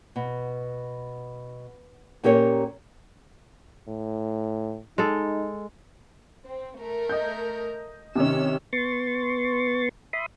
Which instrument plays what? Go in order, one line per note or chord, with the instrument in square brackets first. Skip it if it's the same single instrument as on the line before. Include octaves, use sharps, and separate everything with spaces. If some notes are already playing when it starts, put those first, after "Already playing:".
[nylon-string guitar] B2
A#2 C#4 G4 A#4 C#5
[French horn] A2
[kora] G#3 A4 [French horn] D#4
[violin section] C4
A3 A#4
[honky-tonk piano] D#5 G6
[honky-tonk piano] C3 D#3 C#4 [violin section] C#5 E6
[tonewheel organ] B3 C6 C#6 A6
E5 B5 C6 D#6